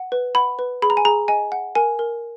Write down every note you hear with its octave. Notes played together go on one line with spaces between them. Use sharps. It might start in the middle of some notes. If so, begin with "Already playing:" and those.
Already playing: F#5
B4
F#5 B5
B4
G#4 B5
A#5
G#5
G#4 A#5
D#5 G#5
F#5
A#4 G#5
A#4